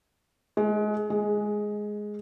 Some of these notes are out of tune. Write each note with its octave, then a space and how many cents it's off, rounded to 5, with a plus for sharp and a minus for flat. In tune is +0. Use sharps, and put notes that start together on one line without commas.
G#3 +25
G#3 +5